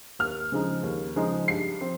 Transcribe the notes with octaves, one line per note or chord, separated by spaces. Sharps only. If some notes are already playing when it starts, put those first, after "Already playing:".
D#2 F6
C#3 F3 G#3 D#4
D#2
C#3 F3 G#3 D#4
G2 C7
F3 C4